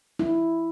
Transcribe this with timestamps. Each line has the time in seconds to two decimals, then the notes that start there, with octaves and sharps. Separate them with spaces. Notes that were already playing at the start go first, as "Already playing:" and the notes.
0.19 E4